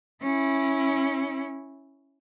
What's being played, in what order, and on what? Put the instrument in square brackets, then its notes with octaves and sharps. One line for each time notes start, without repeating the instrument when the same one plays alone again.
[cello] C#4 E4